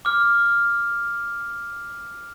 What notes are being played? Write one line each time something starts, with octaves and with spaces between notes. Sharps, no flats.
D6 F6